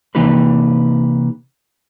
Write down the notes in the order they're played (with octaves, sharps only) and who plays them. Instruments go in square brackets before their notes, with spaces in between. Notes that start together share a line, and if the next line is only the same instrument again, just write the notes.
[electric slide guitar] C3 E3 A#3 D#4 G4 B4